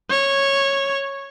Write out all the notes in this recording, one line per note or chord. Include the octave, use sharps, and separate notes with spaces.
C#5